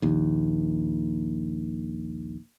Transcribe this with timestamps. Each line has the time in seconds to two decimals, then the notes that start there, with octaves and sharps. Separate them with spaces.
0.02 A#1 D#2